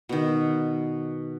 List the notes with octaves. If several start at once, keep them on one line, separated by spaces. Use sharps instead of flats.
B2 D#3